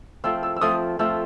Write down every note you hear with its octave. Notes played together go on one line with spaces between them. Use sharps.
F3 A3 C4 F4 E6
E6
E6
F3 A3 C4 F4 D#6
F3 A3 C4 F4 E6